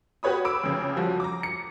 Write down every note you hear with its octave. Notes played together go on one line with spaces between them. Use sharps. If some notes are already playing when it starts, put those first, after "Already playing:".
F#4 G4 B4 C#5 B5 D#6
B5 D6 E6 D7
F2 C#3
F3 G3 F#4
A#5 D6
C#7